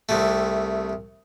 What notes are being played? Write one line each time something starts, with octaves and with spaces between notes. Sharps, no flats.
C2 C3 A3